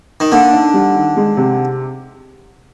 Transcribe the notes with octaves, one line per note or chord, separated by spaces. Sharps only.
D#3
D3 A#3
D#4
G3
D#3
G#3
C3